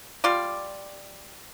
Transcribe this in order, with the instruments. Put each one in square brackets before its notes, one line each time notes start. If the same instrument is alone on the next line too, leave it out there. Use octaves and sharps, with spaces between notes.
[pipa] G3 F4 D5